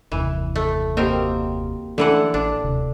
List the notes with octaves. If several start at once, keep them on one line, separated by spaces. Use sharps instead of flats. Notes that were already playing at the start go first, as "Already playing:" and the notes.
F#1 D#2 C3 E3
A3
B2 A#3 C4 G4 A#4
D3 E3 F3 A3 C#4 A4 F#5
A1 D4
D#1 D2 C3